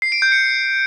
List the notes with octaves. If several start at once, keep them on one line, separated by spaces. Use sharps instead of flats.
C7
D7
G6
C#7